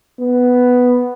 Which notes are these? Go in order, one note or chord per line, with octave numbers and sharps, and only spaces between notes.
B3